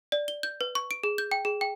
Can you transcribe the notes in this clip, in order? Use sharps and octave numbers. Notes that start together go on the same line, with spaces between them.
D5
G7
G6
B4
C#6
D7
G#4
G6
G5
G#4
G5